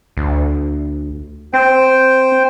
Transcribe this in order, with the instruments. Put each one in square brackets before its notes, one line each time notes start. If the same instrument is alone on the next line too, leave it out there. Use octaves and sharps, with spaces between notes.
[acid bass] D2
[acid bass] C4 [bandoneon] C5 G5